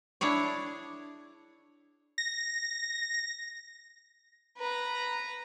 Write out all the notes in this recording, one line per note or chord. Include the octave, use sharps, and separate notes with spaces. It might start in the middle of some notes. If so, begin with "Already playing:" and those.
D4 E4 G#4 C#5
A#6
B4 A#5